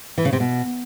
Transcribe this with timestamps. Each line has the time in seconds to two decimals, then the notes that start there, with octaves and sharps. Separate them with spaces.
0.18 E3
0.25 C#3
0.33 C3
0.40 B2